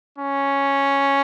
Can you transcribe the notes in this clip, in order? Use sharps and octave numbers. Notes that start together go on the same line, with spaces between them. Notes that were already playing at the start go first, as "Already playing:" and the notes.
C#4